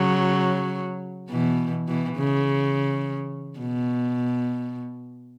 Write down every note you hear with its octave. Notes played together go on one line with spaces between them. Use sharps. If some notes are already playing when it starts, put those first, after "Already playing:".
Already playing: C#3 F#3
B2 E3
B2 E3
C#3
B2